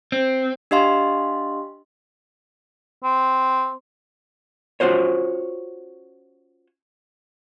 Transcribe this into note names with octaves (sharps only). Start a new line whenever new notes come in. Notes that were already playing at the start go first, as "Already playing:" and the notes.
C4
D4 G4 D#5 F5 C6
C4
C#4 F4 F#4 C5 C#5